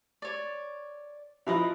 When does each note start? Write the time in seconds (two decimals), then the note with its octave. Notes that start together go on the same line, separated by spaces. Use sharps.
0.22 C#5 D5
1.47 F3 E4 A#4 B4 D#5